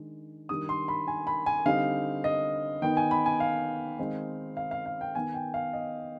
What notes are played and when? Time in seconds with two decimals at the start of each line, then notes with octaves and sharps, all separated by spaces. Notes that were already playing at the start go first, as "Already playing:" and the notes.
Already playing: D#3 G#3 D4
0.49 D#3 G3 D4 D#6
0.69 C6
0.88 B5
1.08 G#5
1.27 B5
1.46 G#5
1.66 D3 G3 C4 D#4 F5
2.24 D#5
2.82 D#3 B3 D#4 G5
2.97 G#5
3.11 B5
3.26 G#5
3.40 F5
3.99 D#3 G#3 C4 D#4
4.57 F5
4.71 F5
4.86 F5
5.01 G5
5.15 D#3 B3 D#4 G#5
5.34 G5
5.54 F5
5.73 D#5